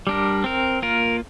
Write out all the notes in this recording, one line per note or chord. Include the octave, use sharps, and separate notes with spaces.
G3 D4 A#4
C4 A#4
A#3 F4 A#4